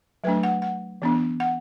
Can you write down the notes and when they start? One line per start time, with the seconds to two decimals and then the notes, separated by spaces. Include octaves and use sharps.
0.24 F#3 A3 D4 B4
0.43 F#5
0.62 F#5
1.02 E3 B3 D4
1.40 F#5